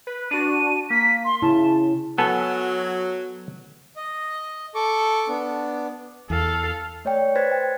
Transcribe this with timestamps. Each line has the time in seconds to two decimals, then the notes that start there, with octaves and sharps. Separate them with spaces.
0.07 B4
0.31 D4 F#4 D#7
0.90 A#3 B6
1.25 C6
1.42 C#3 E4 A5
2.18 F#3 B3 A4 G#5
3.96 D#5
4.75 A4 C#6 D6
5.28 B3 D4
6.30 E2 A4 F5
7.05 A3 C#5 D5 G5
7.36 B4 C5 G#6 A6 B6
7.52 G5